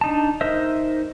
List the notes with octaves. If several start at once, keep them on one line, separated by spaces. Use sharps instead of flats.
D4 D#4 A5
D#4 A#4 C5 D#5 E5